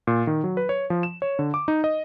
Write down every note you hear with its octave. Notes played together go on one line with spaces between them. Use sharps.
A#2
D#3
F#3
B4
C#5
F3
E7
C#5
D3
D6
D#4
D#5